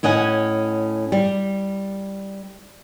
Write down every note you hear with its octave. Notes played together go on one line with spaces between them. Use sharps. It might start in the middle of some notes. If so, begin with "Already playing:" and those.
A2 C#4 D#5 F#5 G#5
G3